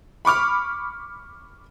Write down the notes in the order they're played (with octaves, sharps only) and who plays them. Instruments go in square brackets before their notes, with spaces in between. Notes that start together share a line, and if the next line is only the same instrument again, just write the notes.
[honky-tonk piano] B5 C#6 D6 F6